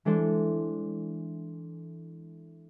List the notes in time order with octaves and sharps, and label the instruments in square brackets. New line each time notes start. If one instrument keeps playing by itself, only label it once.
[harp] E3 G#3 D4 A4 C5